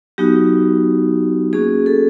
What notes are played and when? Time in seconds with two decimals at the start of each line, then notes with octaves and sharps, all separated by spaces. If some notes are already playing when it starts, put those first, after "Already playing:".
0.18 F#3 B3 D#4 F#4 G4
1.53 A#3 C#4 F#4 G#4
1.86 A4